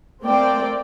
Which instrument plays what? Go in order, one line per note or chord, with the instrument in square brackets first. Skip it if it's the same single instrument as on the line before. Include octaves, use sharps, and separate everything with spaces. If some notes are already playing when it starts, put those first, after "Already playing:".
[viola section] A3 A#3 C4 C5 D5 G5